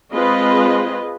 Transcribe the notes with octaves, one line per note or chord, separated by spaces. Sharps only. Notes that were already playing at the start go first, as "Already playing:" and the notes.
G#3 C4 F4 B4 D#5